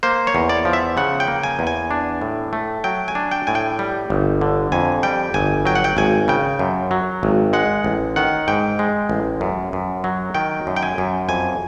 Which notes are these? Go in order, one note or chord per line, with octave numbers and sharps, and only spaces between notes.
A#3 C5
C#5
E2
D5
F3
E5
C#3 F#5
G5
A#3
G#5
E2
G#5
D4
A2
A3
F#3 G5
G#5
D4
G5
A2 G#5
G5
G3
G1
D3
F2 G#5
G3 G5
G1 G#5
F#3 G5
F#5
G5
G#1 G#5
C#3 G5
F#2
F#3
G#1
G#3 F#5
A1
D#3 F#5
G#2 G5
G#3
A1
F#2
F#2
F#3
D#3 G5
F#2
G5
G#5
F#2
F2 G#5